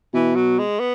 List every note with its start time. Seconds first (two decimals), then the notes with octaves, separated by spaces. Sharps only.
0.14 B2 E3
0.35 F#3
0.59 G#3
0.80 B3